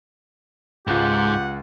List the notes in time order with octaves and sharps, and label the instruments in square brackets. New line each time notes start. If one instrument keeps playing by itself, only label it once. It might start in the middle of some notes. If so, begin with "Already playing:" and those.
[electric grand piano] C#2 F4 [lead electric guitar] G#2 [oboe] G4 [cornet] F#5